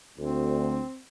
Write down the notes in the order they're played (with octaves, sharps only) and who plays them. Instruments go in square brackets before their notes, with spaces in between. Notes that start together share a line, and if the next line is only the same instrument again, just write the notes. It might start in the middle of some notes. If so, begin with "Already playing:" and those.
[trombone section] D2 [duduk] C4